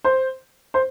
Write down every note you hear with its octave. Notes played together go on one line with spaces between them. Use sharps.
C5
C5